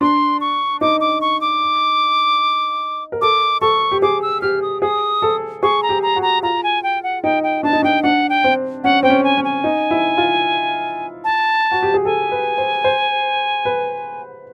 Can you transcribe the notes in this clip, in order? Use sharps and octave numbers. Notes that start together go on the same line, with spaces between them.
D4 C6
C#6
D#4 D6
D6
C#6
D6
A#4
A4 D6
A4 C#6
G4
G#4 D6
E6
G4 F6
D#6
G#4 D#6
A4
G#4 C#6
A#5
G4
A#5
F#4
A#5
F4 A#5
G#5
G5
F#5
D#4 G5
G5
D4 A5
D#4
D4 G5
D4 F#5
G5
C4
C#4 F#5
C4 G5
C#4
G#5
C#4
G#5
D#4
E4
F4
A5
F#4
G4
G#4
A4 G#5
B4
C5
C5
B4